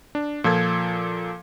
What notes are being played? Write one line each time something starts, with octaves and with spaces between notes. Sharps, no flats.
D4
A#2 F3 A4 G#6